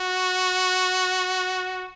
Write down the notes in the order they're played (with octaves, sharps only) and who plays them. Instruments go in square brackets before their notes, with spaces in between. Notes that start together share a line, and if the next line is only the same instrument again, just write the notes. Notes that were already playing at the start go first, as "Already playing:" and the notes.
Already playing: [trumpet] F#4